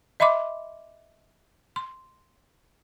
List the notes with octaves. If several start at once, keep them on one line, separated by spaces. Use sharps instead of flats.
D#5 E5 B5 C6 D6
C6